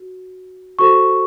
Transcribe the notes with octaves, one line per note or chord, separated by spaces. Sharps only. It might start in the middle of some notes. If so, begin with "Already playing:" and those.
Already playing: F#4
F#4 A4 C5 C#6